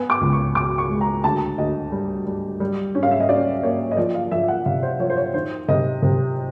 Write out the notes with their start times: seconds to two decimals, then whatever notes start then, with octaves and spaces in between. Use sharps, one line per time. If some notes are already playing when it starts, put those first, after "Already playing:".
Already playing: B3 G#5
0.10 D6
0.21 C#2
0.33 C#6
0.55 B2 D6
0.78 C#6
0.90 G#3
1.01 A#5
1.24 D2 A5
1.58 D2 D#5
1.92 G3
2.27 G3
2.60 G3
2.95 C#4
3.03 F5
3.11 E5
3.20 D#5
3.29 C#4 D5
3.63 A#3 C#5
3.91 D#5
3.97 F3 D5
4.14 F5
4.31 F3 E5
4.48 F#5
4.66 C3 F5
4.83 C5
4.99 F3 C#5
5.10 C5
5.17 C#5
5.34 D#3 C5
5.68 C3 D#5
6.02 C3